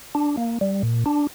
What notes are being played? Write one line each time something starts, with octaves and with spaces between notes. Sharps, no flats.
D4
A#3
G3
A#2
D4